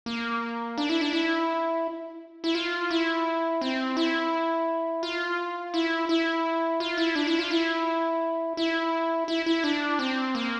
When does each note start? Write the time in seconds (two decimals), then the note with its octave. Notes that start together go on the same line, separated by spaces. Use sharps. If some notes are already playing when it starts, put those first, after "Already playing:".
0.06 A#3
0.78 D4
0.89 E4
1.01 D4
1.13 E4
2.44 E4
2.55 F4
2.91 E4
3.61 C4
3.97 E4
5.03 F4
5.74 E4
6.09 E4
6.80 F4
6.97 E4
7.15 D4
7.27 E4
7.39 F4
7.51 E4
8.57 E4
9.28 E4
9.46 E4
9.64 D4
9.99 C4
10.35 A#3